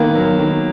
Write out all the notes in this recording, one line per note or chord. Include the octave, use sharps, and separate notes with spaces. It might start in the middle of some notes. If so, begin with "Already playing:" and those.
Already playing: D#3 A#3 B3
F#3
D#3